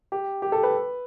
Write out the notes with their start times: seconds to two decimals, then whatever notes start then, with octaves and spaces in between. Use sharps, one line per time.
0.12 G4
0.42 G4
0.52 A4
0.63 B4